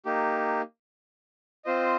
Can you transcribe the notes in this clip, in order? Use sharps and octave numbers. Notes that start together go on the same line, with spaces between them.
A#3 D#4 G4
C4 F4 C5 D#5